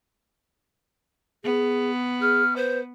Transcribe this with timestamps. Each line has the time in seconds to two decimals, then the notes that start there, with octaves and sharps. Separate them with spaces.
1.44 B3 G#4
2.21 G#4 F6
2.56 B4 C5